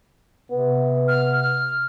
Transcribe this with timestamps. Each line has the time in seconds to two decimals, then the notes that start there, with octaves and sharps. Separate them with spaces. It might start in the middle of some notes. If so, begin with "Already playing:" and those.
0.51 C3 B3
1.08 F6
1.40 F6